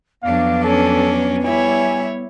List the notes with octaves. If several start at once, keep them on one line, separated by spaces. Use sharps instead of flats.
F2 F#3 B3 D4 F5
C#4 A4
G3 E4 C#5 E5 G#5